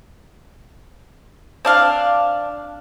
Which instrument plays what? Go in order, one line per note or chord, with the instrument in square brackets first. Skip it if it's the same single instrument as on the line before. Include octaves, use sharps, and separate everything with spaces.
[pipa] C4 D4 F5